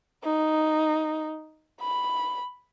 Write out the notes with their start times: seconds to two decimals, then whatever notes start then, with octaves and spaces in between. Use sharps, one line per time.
0.24 D#4
1.81 B5